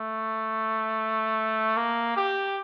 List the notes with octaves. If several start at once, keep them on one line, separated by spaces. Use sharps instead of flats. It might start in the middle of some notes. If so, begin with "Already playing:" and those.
Already playing: A3
A#3
G4